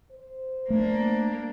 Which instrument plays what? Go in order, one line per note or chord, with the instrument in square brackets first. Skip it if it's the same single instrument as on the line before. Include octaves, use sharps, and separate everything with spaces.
[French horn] C5
[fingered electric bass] A3 [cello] A#3 D4